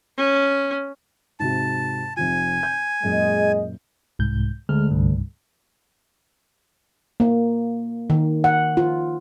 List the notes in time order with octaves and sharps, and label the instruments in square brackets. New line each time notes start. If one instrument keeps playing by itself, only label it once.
[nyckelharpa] C#4
[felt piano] G#2 C3 F#4 [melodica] A5
[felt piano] F1 C3 F4 [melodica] G#5
[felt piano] G6
[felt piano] F#2 A#2 [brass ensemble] G#3 G#4 D#5
[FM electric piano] C2 G#2 G6
[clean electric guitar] D2 [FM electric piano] G#3 F6
[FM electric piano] C2 G2
[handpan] A#3
D#3
F#5
F4